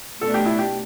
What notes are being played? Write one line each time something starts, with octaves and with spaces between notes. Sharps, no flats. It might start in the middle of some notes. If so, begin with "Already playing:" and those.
B2 A3 D4 A4
G4
E4
G4